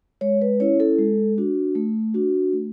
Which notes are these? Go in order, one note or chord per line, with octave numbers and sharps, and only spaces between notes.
G#3 C#5
B4
C#4 E4 C#5
A4
G#3
D4 F#4
A3
D4 F#4
A3